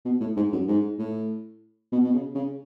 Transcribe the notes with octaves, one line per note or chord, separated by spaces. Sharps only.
B2
A2
G#2
F#2
G#2
A2
B2
B2
C#3
C#3